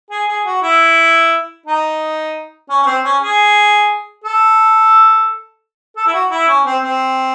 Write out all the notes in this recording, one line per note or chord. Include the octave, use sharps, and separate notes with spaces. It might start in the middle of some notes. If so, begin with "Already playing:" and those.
G#4
G#4
F#4
E4
D#4
C#4
C#4
C4
C#4
G#4
A4
A4
E4
F#4
E4
C#4
C4
C4